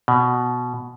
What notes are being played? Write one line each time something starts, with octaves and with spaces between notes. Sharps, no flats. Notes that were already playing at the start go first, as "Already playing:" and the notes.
B2